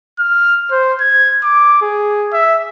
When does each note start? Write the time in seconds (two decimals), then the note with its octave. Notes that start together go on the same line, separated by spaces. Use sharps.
0.19 F6
0.71 C5
1.01 G#6
1.43 D6
1.82 G#4
2.33 E5